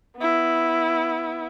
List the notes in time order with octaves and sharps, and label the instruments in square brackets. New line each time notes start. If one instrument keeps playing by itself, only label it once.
[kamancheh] B3 E4